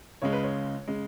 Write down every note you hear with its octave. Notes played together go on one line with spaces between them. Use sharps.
C#2 C#3 G#3 C#5
B4
C#5
C#3 G#3